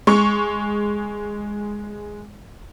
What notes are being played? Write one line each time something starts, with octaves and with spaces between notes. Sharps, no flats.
G#3 C#6